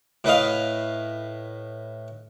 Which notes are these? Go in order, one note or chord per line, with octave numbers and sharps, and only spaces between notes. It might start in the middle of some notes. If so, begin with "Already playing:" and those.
A2 B4 D#5 F5